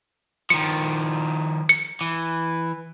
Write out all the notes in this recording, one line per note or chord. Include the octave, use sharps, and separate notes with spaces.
D#3 F3 C#7
C#7
E3